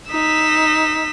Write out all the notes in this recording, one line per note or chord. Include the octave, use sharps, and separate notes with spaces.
D#4 E6 B6